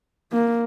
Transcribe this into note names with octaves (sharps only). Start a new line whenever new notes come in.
A#3